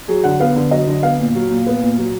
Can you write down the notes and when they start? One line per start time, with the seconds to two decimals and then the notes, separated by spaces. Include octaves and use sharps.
0.08 F#3 G#4
0.24 D3 F#5
0.40 B3 F5
0.56 D3
0.71 F#3 D#5
0.87 D3
1.03 B3 F5
1.19 A#2
1.35 F#3
1.50 A#2
1.67 B3
1.81 A#2
1.98 F#3